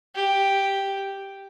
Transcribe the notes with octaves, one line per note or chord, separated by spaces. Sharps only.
G4